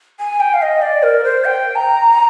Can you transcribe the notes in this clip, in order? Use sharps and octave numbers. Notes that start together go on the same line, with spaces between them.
G#5
G5
F5
D#5
D5
A#4
C5
G5
A#5